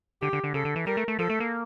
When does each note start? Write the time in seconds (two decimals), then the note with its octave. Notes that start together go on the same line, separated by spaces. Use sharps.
0.22 D3 G4
0.33 D3
0.44 D3
0.54 C#3 A4
0.65 D3
0.76 E3
0.86 G3 A#4
0.97 A3
1.08 A3
1.19 F3 A4
1.30 A3
1.40 A#3